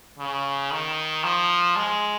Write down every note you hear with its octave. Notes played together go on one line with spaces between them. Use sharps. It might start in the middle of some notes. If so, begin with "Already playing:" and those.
C#3
D#3
F3
G#3